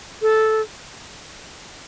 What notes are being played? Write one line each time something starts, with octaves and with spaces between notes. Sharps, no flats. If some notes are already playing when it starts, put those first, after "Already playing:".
A4